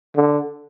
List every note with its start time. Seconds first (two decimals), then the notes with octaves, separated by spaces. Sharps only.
0.16 D3